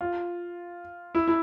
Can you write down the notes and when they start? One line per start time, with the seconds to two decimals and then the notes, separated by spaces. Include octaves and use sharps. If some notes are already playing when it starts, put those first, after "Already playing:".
0.01 F4
1.15 E4
1.28 E4